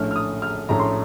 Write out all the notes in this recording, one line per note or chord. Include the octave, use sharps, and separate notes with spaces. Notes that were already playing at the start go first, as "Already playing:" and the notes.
Already playing: A#1 A2 A3 C#4 F6
F6
D#6
F6
A#1 A2 A3 C#4 A#5
C6